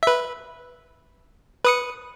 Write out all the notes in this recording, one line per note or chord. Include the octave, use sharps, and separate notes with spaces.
B4 E5
B4 D#6 C#7